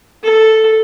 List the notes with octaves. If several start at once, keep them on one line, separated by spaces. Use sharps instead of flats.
A4